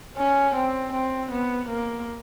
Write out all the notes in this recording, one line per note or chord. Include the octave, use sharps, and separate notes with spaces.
C#4
C4
C4
B3
A#3